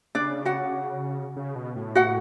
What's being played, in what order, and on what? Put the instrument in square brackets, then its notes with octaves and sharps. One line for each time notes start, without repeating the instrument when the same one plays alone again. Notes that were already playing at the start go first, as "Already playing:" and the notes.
[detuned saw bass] C#3 [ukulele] D4 D5
[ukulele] F#4 F#5
[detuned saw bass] C#3
B2
A2
[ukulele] F#4 F#5